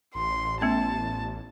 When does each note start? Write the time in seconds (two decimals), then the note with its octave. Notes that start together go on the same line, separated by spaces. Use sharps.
0.15 A1 C6
0.61 A3 B3 C#4 A5